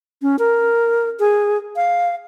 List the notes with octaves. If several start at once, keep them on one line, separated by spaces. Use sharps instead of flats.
C#4
A#4
G#4
F5